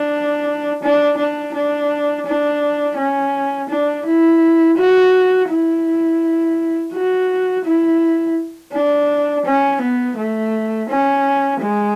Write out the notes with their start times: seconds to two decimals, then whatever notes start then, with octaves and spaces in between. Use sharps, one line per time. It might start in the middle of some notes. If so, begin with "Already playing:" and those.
Already playing: D4
0.83 D4
1.17 D4
1.54 D4
2.26 D4
2.97 C#4
3.69 D4
4.06 E4
4.77 F#4
5.49 E4
6.93 F#4
7.64 E4
8.72 D4
9.45 C#4
9.81 B3
10.17 A3
10.89 C#4
11.60 G#3